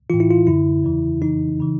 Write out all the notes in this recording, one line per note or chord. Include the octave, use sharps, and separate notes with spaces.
A2 E3 F4
E4
F4
F#2 D3 E4
E2 C#3 E3
F2 C#3 E3 D#4
C#3 E3